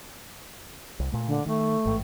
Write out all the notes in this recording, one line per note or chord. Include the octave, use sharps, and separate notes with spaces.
C2
A#2 A3
D3
D#3 A3
A1 G#2